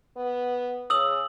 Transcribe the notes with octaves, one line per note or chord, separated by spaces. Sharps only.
B3
C#3 D#6 E6 F#7